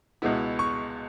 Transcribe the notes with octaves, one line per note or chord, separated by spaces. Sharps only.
C#2 B2 G#3 B3 E4
C#6